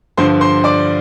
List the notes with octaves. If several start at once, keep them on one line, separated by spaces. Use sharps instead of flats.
G2 D3 F3 C5 C6
C5 C6
D5 D6